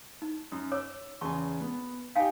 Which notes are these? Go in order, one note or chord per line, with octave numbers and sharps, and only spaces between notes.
D#4
F#2
C#5 D6 E6
E2 C#3 F#4 G#5 A5 C#6
B3
D#4 G4 F5 G#5